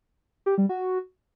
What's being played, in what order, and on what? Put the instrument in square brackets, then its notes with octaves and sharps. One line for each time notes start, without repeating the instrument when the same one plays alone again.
[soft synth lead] G4
G3
F#4